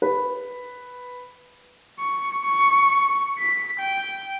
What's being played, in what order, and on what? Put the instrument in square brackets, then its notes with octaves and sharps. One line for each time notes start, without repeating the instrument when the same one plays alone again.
[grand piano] B4
[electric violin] C#6
C#6
B6
G5